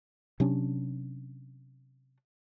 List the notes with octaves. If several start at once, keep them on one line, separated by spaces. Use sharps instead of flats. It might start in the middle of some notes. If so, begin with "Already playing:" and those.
C3 F#3 C#4 D4